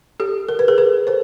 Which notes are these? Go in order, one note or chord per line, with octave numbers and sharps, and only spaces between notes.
G4 A4
A#4
B4
G#4 A#4
A4 B4
A#4 C5